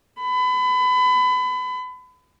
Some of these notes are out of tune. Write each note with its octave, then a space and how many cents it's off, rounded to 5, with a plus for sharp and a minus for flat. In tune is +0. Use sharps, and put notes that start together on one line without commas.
B5 +30